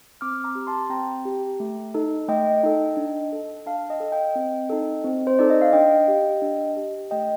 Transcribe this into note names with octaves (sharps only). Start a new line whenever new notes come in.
C4 D6 F6
A#5 D6
G4
A5 C6
C4 G5 A#5
G4
A3
D#4 A4
A3 D#5 G5
D#4 A4
D4
A4
D4 F5 A5
D#5 G5
A4
D#5 G5
C4
D#4 A4
C4
C5
D#4 A4 D5
D#5
F5
D4 D#5 G5
G4
D4
G4
A3 D#5 G5